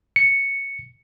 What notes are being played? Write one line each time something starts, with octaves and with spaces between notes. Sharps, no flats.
C#7